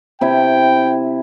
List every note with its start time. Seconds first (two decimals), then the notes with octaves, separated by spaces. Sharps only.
0.21 C3 E4 G5